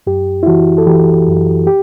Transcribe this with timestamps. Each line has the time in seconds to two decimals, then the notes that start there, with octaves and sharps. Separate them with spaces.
0.07 F#2 G4
0.43 E4
0.46 E3 F#4
0.78 A4
0.87 E3 G4
1.27 F#2
1.67 G4